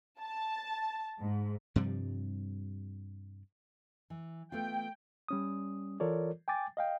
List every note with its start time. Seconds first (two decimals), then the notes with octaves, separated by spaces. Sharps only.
0.20 A5
1.20 G#2
1.76 G2 C3 F3 G3
4.10 E3
4.52 A3 B3 F4 G5
5.29 G3 C#4 D#6
6.00 E3 F4 A4 A#4 C#5 D5
6.48 G5 G#5 D6 A6
6.77 D#5 F5 G5